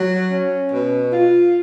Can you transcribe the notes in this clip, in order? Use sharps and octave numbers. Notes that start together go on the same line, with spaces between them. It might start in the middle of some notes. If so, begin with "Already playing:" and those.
Already playing: F#3
C#4
B2
F4